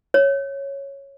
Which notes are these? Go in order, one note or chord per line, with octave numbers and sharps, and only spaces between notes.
C#5